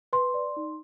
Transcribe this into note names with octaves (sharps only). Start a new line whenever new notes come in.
B4 C6
D5
D#4